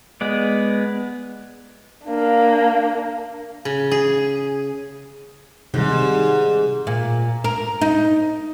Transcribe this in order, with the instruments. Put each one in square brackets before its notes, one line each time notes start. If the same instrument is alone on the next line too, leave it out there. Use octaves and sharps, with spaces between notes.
[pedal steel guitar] G#3 B3 D5
[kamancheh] A#3 D4
[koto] C#3
G#4
[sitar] G#2 [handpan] C3 D#3 G3
[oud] A#2
A#4
D#4